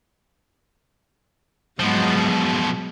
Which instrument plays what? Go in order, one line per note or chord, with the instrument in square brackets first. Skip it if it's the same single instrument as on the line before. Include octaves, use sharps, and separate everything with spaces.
[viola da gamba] G#2 F#3 G#3 [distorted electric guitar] B2 F3